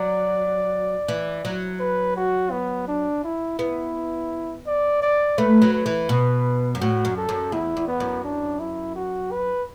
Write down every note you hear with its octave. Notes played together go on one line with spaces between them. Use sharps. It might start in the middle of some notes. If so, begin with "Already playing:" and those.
Already playing: F#3 D5
E3
F#3
B4
F#4
B3
D4
E4
B3 E4
D5
D5
A3 B4
F#3
B4
E3
B2
F#2
A2 F#4
F#2
A4
F#2
E2 E4
E2
B3
F#2
D4
E4
F#4
B4